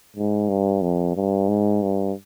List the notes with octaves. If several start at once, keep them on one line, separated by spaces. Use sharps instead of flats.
G#2
G2
F2
G2
G#2
G2